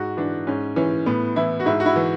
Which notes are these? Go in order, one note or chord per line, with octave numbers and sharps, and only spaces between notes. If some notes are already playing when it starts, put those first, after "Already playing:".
Already playing: G#2 F#4
E3 D4
G#2 C#4
E3 C#4
A2 B3
E3 E4
F#4
G#2 E4
F#4
E4
E3